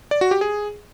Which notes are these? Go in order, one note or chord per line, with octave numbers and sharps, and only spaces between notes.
D5
F#4
G4
G#4